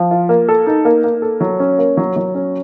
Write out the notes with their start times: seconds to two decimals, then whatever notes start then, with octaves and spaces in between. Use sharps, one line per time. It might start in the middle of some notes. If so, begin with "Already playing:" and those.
Already playing: F3
0.11 F4
0.29 A#3
0.48 A4
0.67 D#4
0.85 A#3
1.04 A#3
1.22 A4
1.41 F#3
1.60 C#4
1.78 A#3
1.97 F#3
2.16 F#3
2.35 C#4